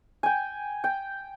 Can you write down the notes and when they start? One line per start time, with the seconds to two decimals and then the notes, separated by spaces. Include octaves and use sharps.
0.23 G5 G#5
0.84 G5